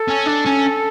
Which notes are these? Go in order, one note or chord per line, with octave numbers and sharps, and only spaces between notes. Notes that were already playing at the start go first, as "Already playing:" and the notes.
Already playing: A4
C#4
D4
C#4